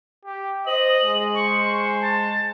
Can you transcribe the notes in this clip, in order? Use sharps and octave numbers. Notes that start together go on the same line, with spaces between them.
G4
C5 D#5 F#7
G#3
C5 C#6
A5